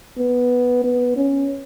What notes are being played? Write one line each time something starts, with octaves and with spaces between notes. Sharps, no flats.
B3
B3
C#4